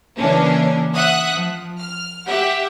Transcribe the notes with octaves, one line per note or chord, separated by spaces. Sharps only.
C#3 E3 A#3 C#4 D4
E5 F#5 D#6 F#6
F3
F6
G4 E5 F#5